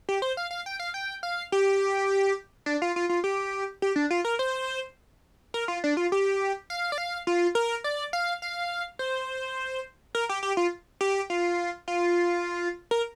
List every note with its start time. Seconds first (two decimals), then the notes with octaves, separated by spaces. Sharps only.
0.09 G4
0.22 C5
0.37 F5
0.51 F5
0.66 G5
0.80 F5
0.94 G5
1.23 F5
1.52 G4
2.66 D4
2.82 F4
2.96 F4
3.09 F4
3.24 G4
3.82 G4
3.96 D4
4.11 F4
4.25 A#4
4.39 C5
5.54 A#4
5.68 F4
5.84 D4
5.97 F4
6.12 G4
6.70 F5
6.92 D5
6.98 F5
7.27 F4
7.55 A#4
7.84 D5
8.13 F5
8.42 F5
8.99 C5
10.15 A#4
10.29 G4
10.43 G4
10.57 F4
11.01 G4
11.30 F4
11.88 F4
12.91 A#4